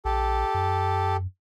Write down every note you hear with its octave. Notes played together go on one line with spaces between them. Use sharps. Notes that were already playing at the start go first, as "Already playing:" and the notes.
A#1 G4 A4
F#2